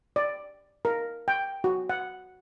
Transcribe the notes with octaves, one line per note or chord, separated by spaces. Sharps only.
D5
A#4
G5
F#4
F#5